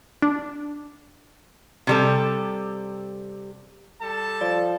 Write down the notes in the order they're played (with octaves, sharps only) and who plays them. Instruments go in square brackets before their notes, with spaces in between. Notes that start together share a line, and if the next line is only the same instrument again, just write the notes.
[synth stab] D4
[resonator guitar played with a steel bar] C3 G3 A4
[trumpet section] G3 A4 A5
[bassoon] F3 [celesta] D5